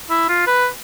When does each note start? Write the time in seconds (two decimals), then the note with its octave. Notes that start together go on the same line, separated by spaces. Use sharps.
0.10 E4
0.29 F4
0.48 B4